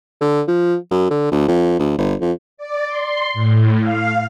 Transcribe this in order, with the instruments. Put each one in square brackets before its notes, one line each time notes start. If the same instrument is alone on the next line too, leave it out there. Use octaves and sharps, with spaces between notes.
[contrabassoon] D3
F3
F#2
D3
D2
F2
D2
G1
F2
[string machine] D5
C6
A2
F5